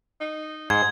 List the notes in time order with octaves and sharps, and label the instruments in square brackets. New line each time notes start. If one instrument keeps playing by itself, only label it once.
[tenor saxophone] D#4
[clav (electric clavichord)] G#2 [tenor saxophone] C5 [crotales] G#6